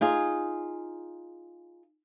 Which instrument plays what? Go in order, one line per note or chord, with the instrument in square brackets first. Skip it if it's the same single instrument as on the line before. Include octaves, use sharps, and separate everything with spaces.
[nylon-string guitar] D#4 F4 G#4